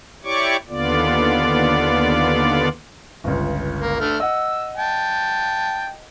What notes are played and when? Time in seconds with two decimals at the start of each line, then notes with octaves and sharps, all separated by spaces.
0.24 E4 G4 C#5 D5 C#6 D6
0.69 D#2 D3 B3 F4 D5
3.24 G1 C#2
3.80 A#3
4.00 D3 A3 F6
4.20 D#5 F#5 E6
4.77 G5 A5